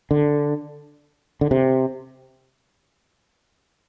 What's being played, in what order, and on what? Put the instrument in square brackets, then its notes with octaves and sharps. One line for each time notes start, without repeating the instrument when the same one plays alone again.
[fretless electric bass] D3
D3
C3